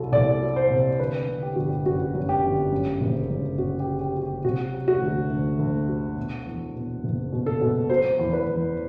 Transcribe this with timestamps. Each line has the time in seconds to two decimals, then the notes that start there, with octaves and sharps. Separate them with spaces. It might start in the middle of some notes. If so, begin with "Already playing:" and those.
Already playing: C2 F#3 A4
0.12 C2 D5
0.42 F#3
0.56 C5
0.70 C3
0.99 D3 B4
1.28 D3
1.43 G4
1.56 G1 F#4
1.70 G4
1.85 F#2 F#4
2.14 F#2
2.29 G4
2.43 G1
2.72 F#2
3.01 F#1
3.30 F#2
3.58 F#2 F#4
3.80 G4
3.87 F#3
4.01 G4
4.16 F#3
4.23 G4
4.44 C3 F#4
4.74 F#3
4.88 F#4
5.02 D2
5.31 D2
5.59 D2
5.88 F#3
6.17 B2
6.46 E2
6.75 B2
7.04 F#1
7.33 B2
7.46 A4
7.61 B2
7.90 F#3 C5
8.19 E2
8.33 B4
8.47 E2